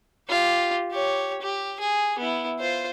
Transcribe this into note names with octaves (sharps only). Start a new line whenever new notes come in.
F4 G4
G4 C#5
G4
G#4
B3 E4
F4 C5